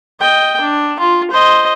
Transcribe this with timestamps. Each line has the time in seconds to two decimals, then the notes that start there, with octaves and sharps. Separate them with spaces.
0.19 D#5 G5
0.61 D4
1.00 F4
1.31 C5 D#5